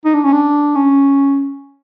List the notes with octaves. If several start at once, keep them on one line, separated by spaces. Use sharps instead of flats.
D#4
D4
C#4
D4
C#4